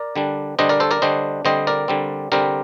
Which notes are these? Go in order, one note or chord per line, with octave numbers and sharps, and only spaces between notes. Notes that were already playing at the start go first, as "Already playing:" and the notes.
Already playing: A#4 D5
D3 G3 D4
D3 G3 D4 C5 D#5
A#4 D5
A4 C5
A#4 D5
D3 G3 D4 C5 D#5
D3 G3 C4 C5 D#5
A#4 D5
D3 G3 C4
D3 G3 C4 G4 A#4